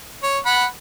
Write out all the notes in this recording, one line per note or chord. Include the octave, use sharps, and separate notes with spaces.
C#5
F#5 B5